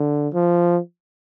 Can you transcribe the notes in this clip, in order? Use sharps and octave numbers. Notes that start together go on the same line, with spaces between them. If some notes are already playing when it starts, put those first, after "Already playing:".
Already playing: D3
F3